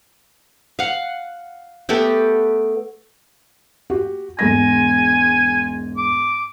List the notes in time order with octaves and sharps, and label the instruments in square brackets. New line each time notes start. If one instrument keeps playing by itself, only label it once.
[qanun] F5 F#5
A3 B3 G4 A4
[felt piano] F#4 G4
[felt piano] E1 G#2 A#6 [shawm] G#5
[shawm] D6